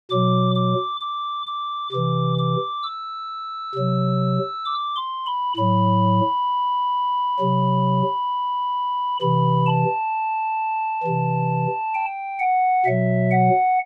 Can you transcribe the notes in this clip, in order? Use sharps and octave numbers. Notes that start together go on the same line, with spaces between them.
B2 F#3 D6
D6
D6
D6
C3 E3 D6
D6
E6
C3 F#3
D6
C6
B5
A2 F#3 B5
C3 F#3
C3 E3 B5
A5
C3 E3
G5
F#5
B2 F#3 E5
F#5